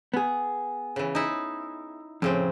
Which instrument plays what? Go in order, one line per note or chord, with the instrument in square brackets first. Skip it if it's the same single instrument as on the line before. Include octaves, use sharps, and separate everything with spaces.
[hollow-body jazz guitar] B3 G#4
[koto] C#3 E3
D#4 E4
[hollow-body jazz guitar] F2 [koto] A2 C#3 C4